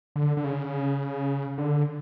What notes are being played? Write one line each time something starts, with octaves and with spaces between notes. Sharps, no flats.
D3
D3
C#3
D3